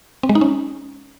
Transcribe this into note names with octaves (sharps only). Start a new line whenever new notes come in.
C4
G#3
D#4
C#4